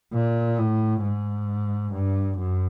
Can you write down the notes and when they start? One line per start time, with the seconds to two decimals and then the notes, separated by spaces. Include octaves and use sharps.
0.14 A#2
0.59 A2
1.03 G#2
1.92 G2
2.38 F#2